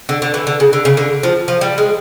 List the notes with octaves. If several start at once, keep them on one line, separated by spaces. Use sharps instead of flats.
D3
D3
E3
D3
C#3
D3
C#3
D3
F3
F3
G3
G#3